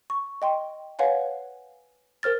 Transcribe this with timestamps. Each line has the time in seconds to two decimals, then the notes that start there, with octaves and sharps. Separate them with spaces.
0.10 C#6
0.42 D#5 G5 C6
0.99 B4 C#5 F5 F#5 G#5
2.23 A#4 C5 F6 A6